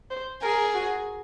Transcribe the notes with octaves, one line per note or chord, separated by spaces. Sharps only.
C5
G#4 A#4
F#4